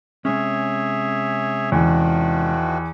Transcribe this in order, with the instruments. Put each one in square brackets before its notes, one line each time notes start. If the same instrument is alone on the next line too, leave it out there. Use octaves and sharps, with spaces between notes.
[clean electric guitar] C3 G#3 C#4 [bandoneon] G#4 C#5 E5
[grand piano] E2 [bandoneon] D#3 F3 F#4